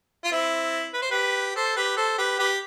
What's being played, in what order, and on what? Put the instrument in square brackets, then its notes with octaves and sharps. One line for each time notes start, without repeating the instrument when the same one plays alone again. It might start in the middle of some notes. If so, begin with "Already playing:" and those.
[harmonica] F4
C4 E4
B4
C5
G4 B4
A4 C5
G4 B4
A4 C5
G4 B4
G4 B4